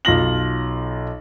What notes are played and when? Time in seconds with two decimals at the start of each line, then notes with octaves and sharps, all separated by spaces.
0.05 B1 F4 A#6 F#7